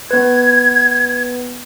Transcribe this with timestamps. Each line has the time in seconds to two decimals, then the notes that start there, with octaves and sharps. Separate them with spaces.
0.11 B3 B4 G#6